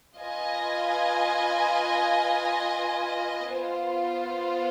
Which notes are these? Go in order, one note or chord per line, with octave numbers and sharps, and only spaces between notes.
F4 B4 D#5 G#5
B3 F4 C5